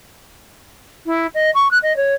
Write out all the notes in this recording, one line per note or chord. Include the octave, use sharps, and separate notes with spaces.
E4
D#5
C#6
F#6
D#5
C#5